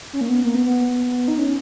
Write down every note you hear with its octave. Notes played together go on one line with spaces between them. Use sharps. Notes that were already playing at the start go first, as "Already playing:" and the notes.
C#4
A#3
B3
A#3
B3
B3
D#4
C#4